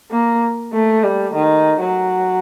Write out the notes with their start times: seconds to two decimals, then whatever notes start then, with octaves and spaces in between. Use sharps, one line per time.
0.11 A#3
0.73 A3
1.04 G3
1.34 D#3
1.81 F#3